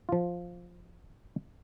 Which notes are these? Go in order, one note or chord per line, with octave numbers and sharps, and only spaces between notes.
F3 F4